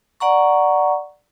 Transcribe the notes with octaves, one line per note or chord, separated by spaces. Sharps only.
D5 F#5 A#5 C#6